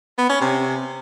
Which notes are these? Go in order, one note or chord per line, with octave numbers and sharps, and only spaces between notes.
B3
C#4
C3